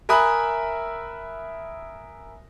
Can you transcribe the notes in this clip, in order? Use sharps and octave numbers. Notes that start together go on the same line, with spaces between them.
A#4 E5 G#5 B5 D#6 F#6